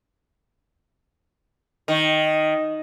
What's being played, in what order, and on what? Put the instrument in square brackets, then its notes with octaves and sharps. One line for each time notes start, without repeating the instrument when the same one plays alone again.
[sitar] D#3